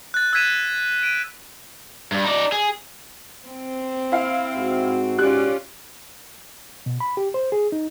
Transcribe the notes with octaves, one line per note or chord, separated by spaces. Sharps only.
F#6 A6
E6 F#6 G#6 B6 D#7 E7
D7 D#7
G2
D#4 D5
G#4
C4
E4 F5
G#2 F#4
C#4 F4 G4 D5 F#6
B2
B5
G4
C5
G#4
D#4